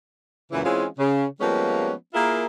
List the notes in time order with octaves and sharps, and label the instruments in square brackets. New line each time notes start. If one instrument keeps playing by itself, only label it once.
[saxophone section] F#2 A#2 C#3 E3
E3 G#3 C4 C#4 F4
C#3
F3 G3 G#3 A#3 B3 C#4
A#3 E4 F4 G#4 A#4